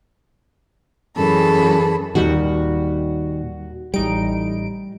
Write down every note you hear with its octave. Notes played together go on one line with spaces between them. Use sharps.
F#2 E3 G#4 A4 B5
D#2 A#2 D#3 G3 F#4
A1 G3 D#4 D7